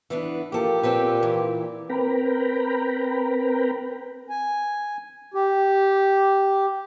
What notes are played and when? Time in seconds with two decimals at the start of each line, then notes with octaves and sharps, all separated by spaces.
0.10 E3 B3 D4
0.52 F3 A#3 G4 A4
0.83 A#2 C4 A4 B4
1.23 E3
1.90 C4 A#4 B4 G5 A#5 B5
4.29 G#5
5.34 G4